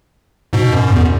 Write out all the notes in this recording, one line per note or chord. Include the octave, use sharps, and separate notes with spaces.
G#2 B2
F#2
E2